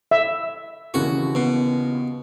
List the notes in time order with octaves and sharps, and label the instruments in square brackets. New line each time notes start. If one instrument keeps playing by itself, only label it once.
[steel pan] E5
[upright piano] D#2 C#3 E3 [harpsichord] F#4
[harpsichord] B2